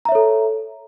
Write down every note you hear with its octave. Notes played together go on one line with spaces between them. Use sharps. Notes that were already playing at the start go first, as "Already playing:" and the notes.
A4 C#5 E5 A#5